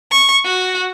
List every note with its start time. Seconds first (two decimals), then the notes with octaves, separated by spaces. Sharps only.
0.11 C#6
0.45 F#4